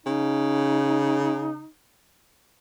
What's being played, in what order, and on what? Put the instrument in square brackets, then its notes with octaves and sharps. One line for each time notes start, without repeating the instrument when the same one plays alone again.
[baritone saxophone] C#3 [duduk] D#4